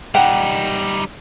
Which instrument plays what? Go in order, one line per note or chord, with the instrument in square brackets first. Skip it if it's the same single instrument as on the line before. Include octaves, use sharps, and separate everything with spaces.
[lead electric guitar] G3 D#4 [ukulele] F#5 G5